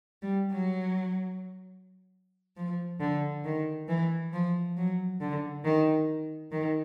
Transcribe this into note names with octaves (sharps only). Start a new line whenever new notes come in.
G3
F#3
F3
D3
D#3
E3
F3
F#3
D3
D#3
D#3